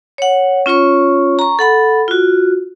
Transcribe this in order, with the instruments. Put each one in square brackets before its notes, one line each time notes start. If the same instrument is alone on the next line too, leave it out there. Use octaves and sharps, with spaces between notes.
[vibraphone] C#5 F#5
C#4 F4 C#5 C#6
A#5 C#6
A4 F#5 B5
F4 F#4